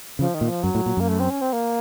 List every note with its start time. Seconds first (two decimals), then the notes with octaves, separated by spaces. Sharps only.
0.19 C#3 F3
0.34 D#3
0.41 A#2
0.48 F3
0.63 F#2 F#3
0.75 A2
0.86 A#2
0.97 F#2 A#3
1.08 A3
1.20 C4
1.30 C#4
1.42 C4
1.53 A#3